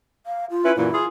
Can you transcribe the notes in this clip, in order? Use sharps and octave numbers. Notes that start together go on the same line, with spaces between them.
F5
F4
C#4 E4 B4
F#2 A#2 E3 E4
F4 G#4